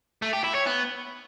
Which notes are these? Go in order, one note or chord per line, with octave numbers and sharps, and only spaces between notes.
A3
G4
E4
C#5
B3